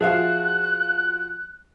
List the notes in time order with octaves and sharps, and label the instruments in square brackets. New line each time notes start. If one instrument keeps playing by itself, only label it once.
[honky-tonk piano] F3 F4 F#4 [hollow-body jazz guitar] G#4 E5 F5 [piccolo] F#6